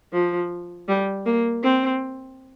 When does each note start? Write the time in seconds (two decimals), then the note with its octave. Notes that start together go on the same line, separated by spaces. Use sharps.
0.13 F3
0.88 G3
1.26 A#3
1.63 C4